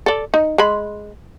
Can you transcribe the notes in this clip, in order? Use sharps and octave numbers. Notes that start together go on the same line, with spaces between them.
A4 D5
D#4
G#3 B5